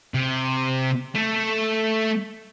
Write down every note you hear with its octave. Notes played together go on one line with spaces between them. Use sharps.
C3
A3 A4